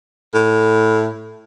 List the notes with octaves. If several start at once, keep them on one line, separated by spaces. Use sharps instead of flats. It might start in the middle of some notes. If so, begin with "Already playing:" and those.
A2